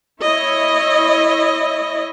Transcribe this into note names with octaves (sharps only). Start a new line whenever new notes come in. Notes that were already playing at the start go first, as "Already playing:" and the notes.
E4 C#5 D#5 E5